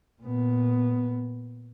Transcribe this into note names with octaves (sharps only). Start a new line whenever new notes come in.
A#2 B3